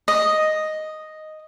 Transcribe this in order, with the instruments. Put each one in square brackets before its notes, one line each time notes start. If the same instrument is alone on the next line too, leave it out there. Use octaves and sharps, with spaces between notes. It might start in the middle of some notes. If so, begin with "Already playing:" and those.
[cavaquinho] D#5